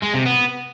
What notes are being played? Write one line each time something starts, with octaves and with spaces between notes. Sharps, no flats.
G#3
C3
B3